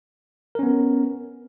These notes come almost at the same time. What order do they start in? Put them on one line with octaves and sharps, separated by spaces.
A#4 C#4 B3